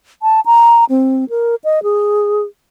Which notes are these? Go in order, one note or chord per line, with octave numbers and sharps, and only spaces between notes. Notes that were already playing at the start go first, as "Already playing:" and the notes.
A5
A#5
C4
A#4
D#5
G#4